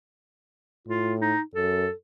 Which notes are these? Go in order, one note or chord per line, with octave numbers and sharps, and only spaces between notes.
A2 F4
D#4
F#2 A4